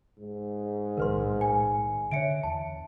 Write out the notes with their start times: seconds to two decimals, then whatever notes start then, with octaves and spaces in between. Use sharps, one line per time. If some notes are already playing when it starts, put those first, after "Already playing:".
0.19 G#2
0.97 B1 A2 D#3 A#4 B4 C6
1.41 G#5
2.11 D3 C#5 D5 E5 G5 C#7 D7
2.43 E2 A5